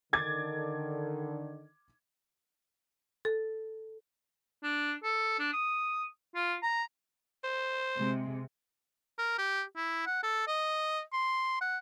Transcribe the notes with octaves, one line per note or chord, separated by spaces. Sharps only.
D3 D#3 D6 G#6 A6
A4
D4
A4
D4
D#6
F4
A#5
C5
C3 G#3
A#4
G4
E4
F#5
A4
D#5
C6
F#5